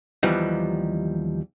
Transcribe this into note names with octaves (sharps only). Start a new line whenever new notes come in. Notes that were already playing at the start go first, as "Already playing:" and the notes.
D#2 E3 F3 G3 B3 D#4